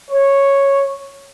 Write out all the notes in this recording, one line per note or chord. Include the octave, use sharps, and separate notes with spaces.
C#5